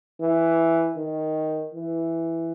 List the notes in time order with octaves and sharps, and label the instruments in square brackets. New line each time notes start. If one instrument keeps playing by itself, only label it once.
[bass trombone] E3
D#3
E3